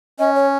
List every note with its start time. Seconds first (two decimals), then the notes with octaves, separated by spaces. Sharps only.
0.19 C#4 D#5
0.35 C#5